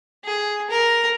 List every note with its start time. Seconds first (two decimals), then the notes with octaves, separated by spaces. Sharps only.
0.24 G#4
0.70 A#4